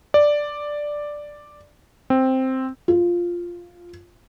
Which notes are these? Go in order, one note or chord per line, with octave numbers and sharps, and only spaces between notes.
D5
C4
F4